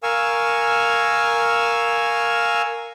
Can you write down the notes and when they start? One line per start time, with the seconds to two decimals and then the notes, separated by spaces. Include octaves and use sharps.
0.03 A#4 F5 G#5 C#6 E6